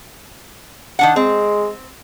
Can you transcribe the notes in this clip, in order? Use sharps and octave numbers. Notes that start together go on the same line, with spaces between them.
D#3 D4 F#5
G#3 C4